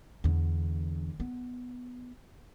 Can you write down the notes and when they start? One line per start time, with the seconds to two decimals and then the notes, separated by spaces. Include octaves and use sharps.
0.24 E2 D3
1.20 B3